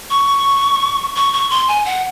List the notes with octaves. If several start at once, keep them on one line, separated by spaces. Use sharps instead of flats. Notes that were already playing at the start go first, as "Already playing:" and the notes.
C#6
C#6
C#6
C6
G#5
F#5